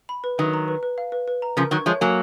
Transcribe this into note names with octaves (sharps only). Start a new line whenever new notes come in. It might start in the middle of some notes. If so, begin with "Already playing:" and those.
B5
B4
D#3 F#3 B4
A#5
B4
B4
F5
B4
B4
A#5
C#3 F3 A#4
D#3 F#3 C#6
F3 G#3 C#5
F#3 A#3 G#5